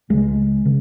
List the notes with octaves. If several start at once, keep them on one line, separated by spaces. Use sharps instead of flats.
C#2 C#3 G#3
C#3